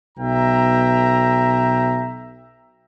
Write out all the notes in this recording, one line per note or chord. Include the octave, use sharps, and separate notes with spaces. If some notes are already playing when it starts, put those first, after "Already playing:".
B1 B2 E5 G5 A#5